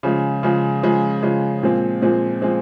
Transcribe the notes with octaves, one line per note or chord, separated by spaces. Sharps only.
C#3 F3 G#3
C#3 F3 G#3
C#3 F3 G#3
C#3 F3 G#3
A#2 F3 G#3 C4
A#2 F3 G#3 C4
F3 G#3 C4